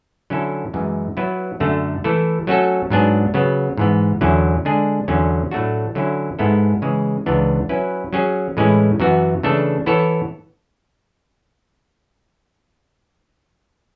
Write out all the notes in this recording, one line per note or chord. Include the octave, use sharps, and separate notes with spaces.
D3 F#3 C#4 E4 A4
F#2 E3 G#3
F#3 B3 E4 B4
F#2 D3 A3
E3 A3 E4 A4
F#3 A3 C#4 F#4 A4
G#2 F#3 B3 D4 G#4
C#3 F#3 B3
G#2 E3 B3
E2 D3 F#3 C#4 E4
D3 G#3 D4 G#4
E2 D3 F#3 C#4
A2 F#3 A3 D4 F#4
D3 F#3 C#4 E4
G#2 G#3 B3 E4 A4
C#3 E3 G#3
C#2 C#3 E3 B3 D4
F#3 C#4 E4 B4
F#3 C#4 G#4
A2 E3 G#3 C#4 E4
F#2 E3 B3 F#4
C#3 E3 A3 D4 A4
E3 B3 E4 A4 C#5